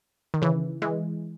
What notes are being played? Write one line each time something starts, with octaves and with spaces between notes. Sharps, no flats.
D#3
C#3 E3
E3 G#3